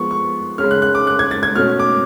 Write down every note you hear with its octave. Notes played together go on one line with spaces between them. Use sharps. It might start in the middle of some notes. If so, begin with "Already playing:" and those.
Already playing: F3 G#3 B3 C#6
C#6
C#3 G#3 C#4 F6
F#6
F#6
D6
F#6
G#6
A6
G#6
B2 A3 C#4 F6
D6